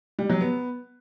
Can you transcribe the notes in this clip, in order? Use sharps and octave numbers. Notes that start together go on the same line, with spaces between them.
G3
F#3
B3